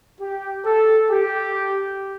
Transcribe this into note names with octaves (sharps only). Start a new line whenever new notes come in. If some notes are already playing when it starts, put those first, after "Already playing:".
G4
A4
G4